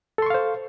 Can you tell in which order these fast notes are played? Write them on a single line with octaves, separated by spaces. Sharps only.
A4 C6 C#6 F5 C5